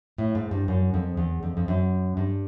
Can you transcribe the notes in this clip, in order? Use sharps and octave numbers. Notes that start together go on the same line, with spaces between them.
A2
G#2
G2
F#2
F2
E2
F2
F2
F#2
G2